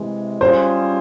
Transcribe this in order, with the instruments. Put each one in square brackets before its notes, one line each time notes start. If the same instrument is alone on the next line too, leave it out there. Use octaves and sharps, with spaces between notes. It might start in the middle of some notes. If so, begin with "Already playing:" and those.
Already playing: [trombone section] C3 E3 G#3
[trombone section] G3 C#4 F4 G#4 [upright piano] C5